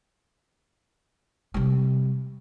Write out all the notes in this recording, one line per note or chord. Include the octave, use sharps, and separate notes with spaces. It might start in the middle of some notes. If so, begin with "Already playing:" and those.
C3 G3